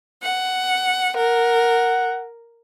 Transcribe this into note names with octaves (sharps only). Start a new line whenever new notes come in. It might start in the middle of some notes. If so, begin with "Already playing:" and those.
F#5
A#4 F#5